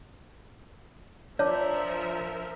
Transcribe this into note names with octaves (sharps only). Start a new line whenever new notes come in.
F3 D4 A#4 C#5 E5